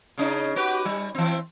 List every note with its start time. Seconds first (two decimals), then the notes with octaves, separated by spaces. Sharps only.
0.18 C#3 C#4 D#4
0.56 F#4 G4 B4
0.85 G3
1.15 E3 C4